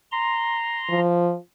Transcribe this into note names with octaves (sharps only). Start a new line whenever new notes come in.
A#5 C6
F3